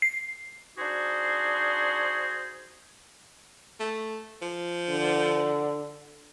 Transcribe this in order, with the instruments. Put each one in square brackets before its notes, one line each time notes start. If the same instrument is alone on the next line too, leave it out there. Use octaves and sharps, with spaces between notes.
[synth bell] C7
[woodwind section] D4 D#4 F#4 G#4 C5
[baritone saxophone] A3
F3
[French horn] D3